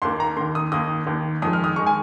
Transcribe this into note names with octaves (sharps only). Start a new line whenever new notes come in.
D#2 D#3 A#3 C6
A#5
D#2 D#3 A#3 C6
D#6
D#2 D#3 A#3 D#6
D#2 D#3 A#3
F2 D#3 G#3 D#6
F6
D#6
D#3 G#3 C#6
G#5